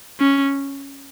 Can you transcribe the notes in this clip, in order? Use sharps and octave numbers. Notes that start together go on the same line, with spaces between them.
C#4